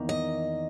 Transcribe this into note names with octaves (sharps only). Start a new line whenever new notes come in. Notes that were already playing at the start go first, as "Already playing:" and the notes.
Already playing: E2 D#3 A#3
D#5